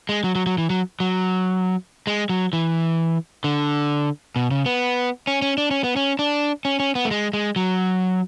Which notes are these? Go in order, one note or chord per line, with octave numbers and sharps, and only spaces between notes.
G#3
F#3
F#3
F#3
E3
F#3
F#3
G#3
F#3
E3
D3
B2
C#3
B3
C#4
C#4
D4
C#4
B3
C#4
D4
C#4
C#4
B3
A3
G#3
G#3
F#3